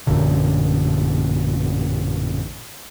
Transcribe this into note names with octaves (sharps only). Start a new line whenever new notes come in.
A1 F#2 A#2 D3